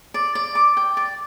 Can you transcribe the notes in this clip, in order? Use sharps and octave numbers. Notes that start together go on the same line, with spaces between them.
D5
D5
D6
G5
D5